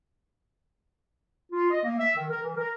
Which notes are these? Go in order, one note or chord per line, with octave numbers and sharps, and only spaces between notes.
F4
D#5
A#3
E5
D#3
A#4
E3
A#4